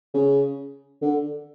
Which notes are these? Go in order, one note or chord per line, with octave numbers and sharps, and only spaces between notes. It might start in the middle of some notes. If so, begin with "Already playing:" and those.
C#3
D3